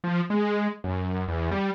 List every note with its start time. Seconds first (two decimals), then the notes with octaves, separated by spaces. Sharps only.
0.04 F3
0.30 G#3
0.84 F#2
1.28 E2
1.51 G3